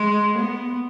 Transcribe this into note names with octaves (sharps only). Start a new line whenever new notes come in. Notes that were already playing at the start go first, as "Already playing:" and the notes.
Already playing: G#3
B3